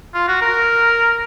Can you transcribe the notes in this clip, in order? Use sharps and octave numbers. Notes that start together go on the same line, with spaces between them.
F4
F#4
A#4